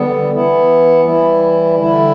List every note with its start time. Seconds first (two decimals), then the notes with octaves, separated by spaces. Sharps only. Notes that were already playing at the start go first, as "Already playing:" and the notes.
Already playing: D3 G3 B3
0.31 E3 B3 E4
1.04 E3 G3 E4
1.77 D3 G3 E4